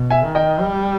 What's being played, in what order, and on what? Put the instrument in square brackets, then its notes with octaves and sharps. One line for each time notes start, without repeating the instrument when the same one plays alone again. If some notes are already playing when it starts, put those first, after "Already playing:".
Already playing: [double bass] B2
[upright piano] E5 G#5
[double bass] D#3
[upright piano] D#5 G5
[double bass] G3